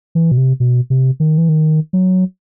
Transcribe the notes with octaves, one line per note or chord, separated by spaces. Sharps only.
E3
B2
C3
B2
C3
D#3
E3
D#3
F#3